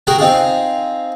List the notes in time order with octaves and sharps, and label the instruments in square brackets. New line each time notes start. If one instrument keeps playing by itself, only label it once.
[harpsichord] F#4 G#4 A#4 G5
C4 D#4 F4 G#4